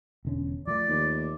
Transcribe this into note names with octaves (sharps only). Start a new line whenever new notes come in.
E1 D3 C#4
F3 A3 D5
D#2